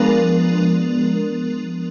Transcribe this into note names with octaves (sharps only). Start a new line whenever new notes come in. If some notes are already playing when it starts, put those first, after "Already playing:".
Already playing: F3 G#3 B3 D4 A#4